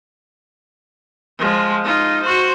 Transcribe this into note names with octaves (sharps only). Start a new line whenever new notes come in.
F3 G#3
D#4 F4
F#4 C5